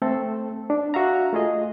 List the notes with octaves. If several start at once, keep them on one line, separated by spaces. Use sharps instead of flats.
A3 C4 A4
D4
F#4 E5 F5 A#5
A3 F4 G#4 D#5